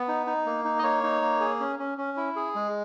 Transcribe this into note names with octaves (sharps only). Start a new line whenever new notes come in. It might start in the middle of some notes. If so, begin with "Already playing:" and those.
Already playing: B3
D#4
D#4
A#3
D#4
D#5
A#3 C#5
D#4
A#3
G#4
C#4
C#4
C#4
E4
G#4
G#3